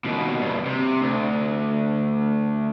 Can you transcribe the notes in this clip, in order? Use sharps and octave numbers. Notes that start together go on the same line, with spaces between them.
D#2 B2
E2 G2
C3
D2